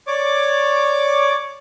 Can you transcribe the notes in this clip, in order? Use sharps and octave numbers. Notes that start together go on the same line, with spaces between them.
C#5 D5 D6